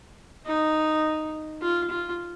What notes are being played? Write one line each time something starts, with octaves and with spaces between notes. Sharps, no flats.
D#4
F4
F4